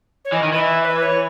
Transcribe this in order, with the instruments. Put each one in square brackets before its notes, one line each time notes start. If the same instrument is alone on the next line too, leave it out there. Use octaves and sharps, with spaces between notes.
[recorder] C#5
[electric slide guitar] E3 [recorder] D#5
[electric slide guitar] D#3
[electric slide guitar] E3 [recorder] D#5
[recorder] E5
B4
C#5